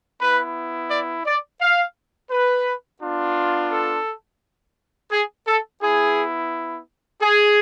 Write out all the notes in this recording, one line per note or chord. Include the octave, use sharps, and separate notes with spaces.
B3 E4 B4
D5
D5
F5
B4
B3 D4 F4
A4
G#4
A4
B3 E4 G#4
G#4